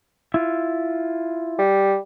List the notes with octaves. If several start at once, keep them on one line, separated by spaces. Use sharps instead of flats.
E4 F4
G3